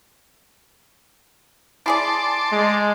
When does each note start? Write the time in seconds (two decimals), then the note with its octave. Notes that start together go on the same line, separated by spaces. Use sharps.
1.86 E4 G#4 D5 A5 C6 D6
2.52 G#3